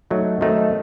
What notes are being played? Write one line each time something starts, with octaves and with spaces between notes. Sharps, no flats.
F#3 A3 D#4 F#4
D#3 F#3 A3 C4 D#4